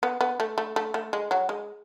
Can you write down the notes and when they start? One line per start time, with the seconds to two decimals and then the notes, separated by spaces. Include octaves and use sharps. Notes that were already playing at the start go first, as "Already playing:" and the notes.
0.03 B3
0.21 B3
0.40 A3
0.58 A3
0.76 A3
0.94 A3
1.13 G#3
1.31 F#3
1.49 G#3